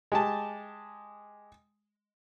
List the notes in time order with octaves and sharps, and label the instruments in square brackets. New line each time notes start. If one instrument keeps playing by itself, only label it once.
[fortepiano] G#3 G4 A5